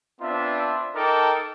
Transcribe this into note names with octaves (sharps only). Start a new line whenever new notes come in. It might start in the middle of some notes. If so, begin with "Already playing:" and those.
B3 C4 D4 F4 E5
D#4 A4 A#4 G5 A5 D6